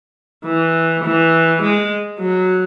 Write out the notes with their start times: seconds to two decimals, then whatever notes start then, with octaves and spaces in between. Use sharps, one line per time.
0.44 E3
1.04 E3
1.62 G#3
2.20 F#3